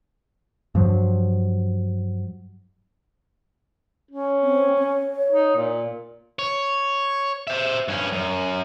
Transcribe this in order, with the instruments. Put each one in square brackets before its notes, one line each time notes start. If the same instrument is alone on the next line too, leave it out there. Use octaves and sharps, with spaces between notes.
[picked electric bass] G2 F3 F#3
[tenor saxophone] C#4
[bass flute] C4
C#5
[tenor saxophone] D#4
A#2
[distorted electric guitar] C#5
C5 E5
G2 C#4
F#2